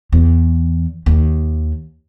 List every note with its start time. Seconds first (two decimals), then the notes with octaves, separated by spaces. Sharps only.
0.12 E2
1.06 D#2